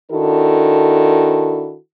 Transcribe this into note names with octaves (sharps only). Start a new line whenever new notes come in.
D#3 D4 E4 F#4 A4